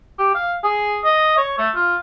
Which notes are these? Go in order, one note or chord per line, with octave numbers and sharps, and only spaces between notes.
G4
F5
G#4
D#5
C#5
A3
F4